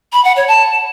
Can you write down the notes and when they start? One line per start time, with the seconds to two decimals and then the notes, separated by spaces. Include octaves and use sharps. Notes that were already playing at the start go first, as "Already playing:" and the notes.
0.13 B5
0.25 F#5
0.36 C#5
0.48 A5